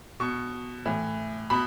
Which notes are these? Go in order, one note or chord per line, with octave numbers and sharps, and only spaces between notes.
B2 C#6
A2 E3
B2 B5